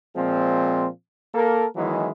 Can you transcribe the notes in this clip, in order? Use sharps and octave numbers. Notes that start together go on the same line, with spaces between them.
A#2 F3 G#3 C4
A#3 A4 A#4
D#3 E3 F#3 G#3 B3 E4